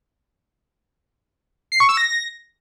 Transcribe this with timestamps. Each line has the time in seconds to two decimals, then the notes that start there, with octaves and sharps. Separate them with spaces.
1.72 C7
1.80 C#6
1.89 E6
1.97 A#6